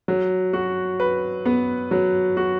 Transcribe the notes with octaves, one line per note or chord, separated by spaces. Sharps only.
F#3
F#4
B4
B3
F#3
F#4